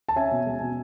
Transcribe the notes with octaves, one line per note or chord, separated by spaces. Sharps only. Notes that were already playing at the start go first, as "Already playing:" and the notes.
A5
C#4 E5 G#5
B2
G#3
B2